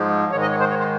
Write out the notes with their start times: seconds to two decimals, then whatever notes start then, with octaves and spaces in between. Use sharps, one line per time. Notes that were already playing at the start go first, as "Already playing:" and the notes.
Already playing: G#2 F3 G#3
0.32 G#2 D#3 G#3 C#5
0.42 D#5
0.51 C#5
0.60 C5
0.70 C#5
0.79 C5